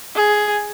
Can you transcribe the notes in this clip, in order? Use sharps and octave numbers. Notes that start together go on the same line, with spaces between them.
G#4